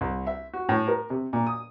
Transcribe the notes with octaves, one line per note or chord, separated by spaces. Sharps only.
C2
E5
F#4
A2
A#4
C3
A#2
D#6